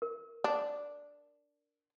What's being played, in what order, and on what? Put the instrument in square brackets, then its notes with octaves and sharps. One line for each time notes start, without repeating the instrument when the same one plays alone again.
[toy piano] A#4
[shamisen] D4